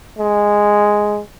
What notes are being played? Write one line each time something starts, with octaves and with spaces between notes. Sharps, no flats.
G#3